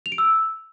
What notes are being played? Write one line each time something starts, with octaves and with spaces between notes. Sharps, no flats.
F7
D7
E6